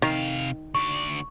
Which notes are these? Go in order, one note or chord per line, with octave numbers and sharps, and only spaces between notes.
C3 D#3 F5
D2 D5 C#6